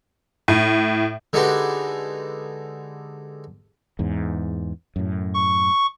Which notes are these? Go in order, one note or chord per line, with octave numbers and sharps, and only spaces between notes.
A2
D3 G#3 D#4 F#4 G4 B4
E2 G#2
F#2 A2
C#6